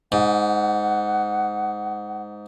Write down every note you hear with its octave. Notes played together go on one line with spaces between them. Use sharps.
G#2 F#5